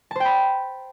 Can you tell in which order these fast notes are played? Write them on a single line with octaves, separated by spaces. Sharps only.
A5 C5 G5 B5